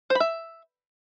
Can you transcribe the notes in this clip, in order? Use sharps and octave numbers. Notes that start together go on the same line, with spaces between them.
C5
B5
E5